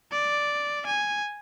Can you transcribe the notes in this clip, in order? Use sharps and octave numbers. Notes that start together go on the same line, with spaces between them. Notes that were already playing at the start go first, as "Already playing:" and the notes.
D5
G#5